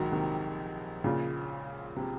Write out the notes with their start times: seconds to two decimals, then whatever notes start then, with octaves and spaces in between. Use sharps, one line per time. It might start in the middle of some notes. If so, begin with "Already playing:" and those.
Already playing: A#1 G#2 D#3 F#3 G#3
0.12 C3 D#3
1.04 A#2 C#3
1.97 C3